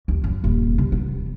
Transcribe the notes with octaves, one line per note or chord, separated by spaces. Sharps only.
D#2
F#2
D#1
C3
B3